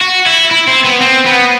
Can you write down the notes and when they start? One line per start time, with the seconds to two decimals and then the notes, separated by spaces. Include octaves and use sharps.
0.01 F#4
0.26 E4
0.51 E4
0.68 C4
0.84 B3
1.01 C4
1.26 B3